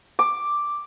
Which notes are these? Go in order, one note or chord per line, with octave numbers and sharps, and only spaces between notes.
D6